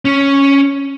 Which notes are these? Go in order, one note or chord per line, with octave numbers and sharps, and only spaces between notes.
C#4